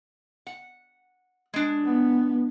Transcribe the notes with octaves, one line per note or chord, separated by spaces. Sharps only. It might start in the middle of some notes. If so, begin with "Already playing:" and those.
F#5
G#3 D4
B3